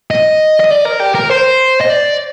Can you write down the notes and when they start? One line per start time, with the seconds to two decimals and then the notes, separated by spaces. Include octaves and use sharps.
0.11 D#5
0.60 D#5
0.70 D5
0.85 A#4
1.00 G4
1.15 A#4
1.30 C5
1.81 D#5
1.90 D5